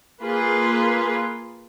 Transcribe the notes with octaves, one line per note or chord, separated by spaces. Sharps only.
A#3 F4 G#4 B4